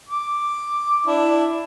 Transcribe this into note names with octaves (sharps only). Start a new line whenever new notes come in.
D6
D4 E4